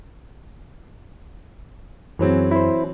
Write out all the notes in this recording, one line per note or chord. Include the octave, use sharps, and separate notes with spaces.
F#2 E3 F#3 C4 G#4
E4 C5